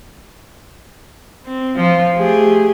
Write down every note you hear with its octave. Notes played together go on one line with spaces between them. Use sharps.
C4
F3 F4
A3 G4 G#4